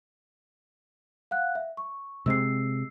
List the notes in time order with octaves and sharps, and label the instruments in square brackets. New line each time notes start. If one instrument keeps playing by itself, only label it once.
[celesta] F5 F#5 F#6
E5
C#6
[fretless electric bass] C3 G#3 C4 [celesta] E6 C7